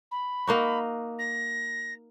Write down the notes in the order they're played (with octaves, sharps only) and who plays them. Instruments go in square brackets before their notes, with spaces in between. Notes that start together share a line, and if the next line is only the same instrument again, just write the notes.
[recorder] B5
[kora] A#3 D#4 F#4
[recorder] A#6